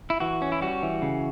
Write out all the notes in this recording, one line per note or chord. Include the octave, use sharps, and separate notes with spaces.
E4
E3 F#4
C#4
E4
G3 F#4
E3
C#3